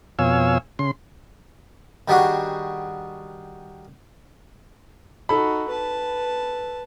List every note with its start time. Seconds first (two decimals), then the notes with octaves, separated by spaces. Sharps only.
0.19 F2 B2 C#5 F5 G#5 E6
0.79 C#3 C6
2.08 D#3 G3 D4 F#4 G#4
5.29 D#4 F#4 A4 B5
5.68 B4 A5